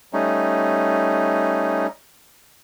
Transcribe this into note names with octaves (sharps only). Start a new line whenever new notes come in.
G3 A3 C#4 D#4